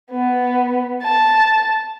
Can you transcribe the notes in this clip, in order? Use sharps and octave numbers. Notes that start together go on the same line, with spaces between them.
B3
A5